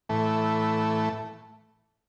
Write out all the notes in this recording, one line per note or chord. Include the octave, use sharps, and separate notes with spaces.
A2 E3 A3